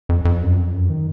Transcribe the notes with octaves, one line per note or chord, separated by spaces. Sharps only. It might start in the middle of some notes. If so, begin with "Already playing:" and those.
F2
F2
F#2
F2
F#2
D#3